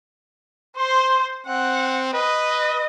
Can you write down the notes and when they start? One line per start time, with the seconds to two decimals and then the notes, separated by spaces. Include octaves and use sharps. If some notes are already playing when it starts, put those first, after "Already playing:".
0.77 C5 C6
1.46 C4 F#5
2.13 B4 D#5